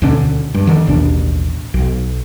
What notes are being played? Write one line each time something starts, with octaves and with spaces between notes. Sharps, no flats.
D2 B2 D3 C#4
G2
D3 D#3
A1 D#2 B2 D4
B1